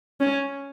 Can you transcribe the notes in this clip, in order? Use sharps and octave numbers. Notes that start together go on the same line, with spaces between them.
C#4